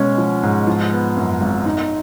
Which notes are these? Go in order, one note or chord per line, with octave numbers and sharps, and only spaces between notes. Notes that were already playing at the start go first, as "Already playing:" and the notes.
Already playing: B2 G#3 C#4
F3
G#2
F3
B3
F#2
G#1
D#4